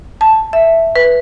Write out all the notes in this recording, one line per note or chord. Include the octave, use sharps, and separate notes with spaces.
A5
E5
B4